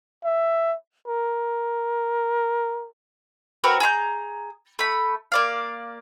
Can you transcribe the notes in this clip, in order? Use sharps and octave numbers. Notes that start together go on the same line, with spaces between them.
E5
A#4
C4 F#4 A#4 B4
G#4 A#5 C6 G6
A3 B5
A#3 D5 F5